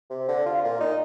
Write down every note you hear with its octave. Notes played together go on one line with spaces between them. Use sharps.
C3
D3
F4
A#2
D#4